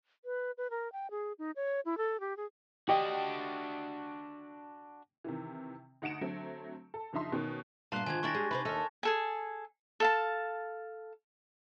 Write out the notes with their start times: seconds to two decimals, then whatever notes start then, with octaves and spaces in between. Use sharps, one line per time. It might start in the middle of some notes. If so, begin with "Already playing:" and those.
0.25 B4
0.58 B4
0.71 A#4
0.92 G5
1.11 G#4
1.39 D#4
1.56 C#5
1.85 E4
1.98 A4
2.20 G4
2.37 G#4
2.89 D4 F#4 G4 D#5 G5
5.24 C3 D#3 E3
6.02 D2 D#4 F#5 C#7 D7 E7
6.21 D3 F#3 A3 C4
6.94 A4
7.13 F#1 F3 D4 D#4 E5 C6
7.32 B2 D#3 C#4
7.92 G2 A#2 B3 F4 F5 A5 C6 F#6
8.06 G#2 D3 D#3 F3 G#5 G#6
8.23 G3 C#4 D4 E4 G5 C#6 A6 A#6
8.34 G#3 G4 G#4
8.51 G#2 C3 D#4 B4 C5
8.65 D#2 D#4 A4 A#4 D#5
9.03 G#4 A4 G#5
10.00 A4 F5 A5